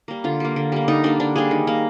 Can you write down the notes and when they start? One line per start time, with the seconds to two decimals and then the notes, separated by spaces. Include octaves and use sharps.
0.08 G3 A#3
0.24 D3 F4
0.40 G3 A#3
0.56 D3
0.72 G3 A#3
0.88 D3 D#4
1.04 G3 A#3 D4
1.20 D3 D4
1.36 G3 A#3 G#4
1.51 D#3
1.67 A#3